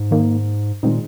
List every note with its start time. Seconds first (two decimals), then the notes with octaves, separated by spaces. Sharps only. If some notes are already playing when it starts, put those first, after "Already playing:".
Already playing: G#2
0.11 D#3 A#3 D#4
0.83 A#2 D#3 G#3 C4 D#4